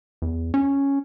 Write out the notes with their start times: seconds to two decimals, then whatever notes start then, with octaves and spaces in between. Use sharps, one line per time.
0.22 E2
0.54 C#4